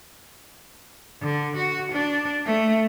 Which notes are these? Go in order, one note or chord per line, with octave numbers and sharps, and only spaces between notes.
D3
F#4
D4
A3